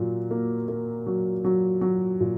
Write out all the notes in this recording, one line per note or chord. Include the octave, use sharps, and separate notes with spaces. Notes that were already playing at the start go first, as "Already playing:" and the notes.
Already playing: A#2 F#3
A#3
A#3
F#3
F#3
F#3
A#2